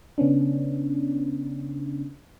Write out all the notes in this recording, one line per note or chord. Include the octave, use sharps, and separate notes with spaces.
C#3 B3 C#4 D4